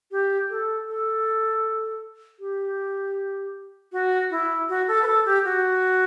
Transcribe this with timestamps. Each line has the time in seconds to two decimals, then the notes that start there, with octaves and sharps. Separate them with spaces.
0.11 G4
0.50 A4
0.88 A4
2.40 G4
3.92 F#4
4.31 E4
4.69 F#4
4.88 A4
5.03 B4
5.07 A4
5.26 G4
5.45 F#4